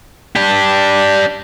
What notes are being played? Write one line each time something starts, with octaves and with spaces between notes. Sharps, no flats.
D4 G4